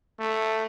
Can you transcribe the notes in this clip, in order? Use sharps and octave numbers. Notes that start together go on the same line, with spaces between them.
A3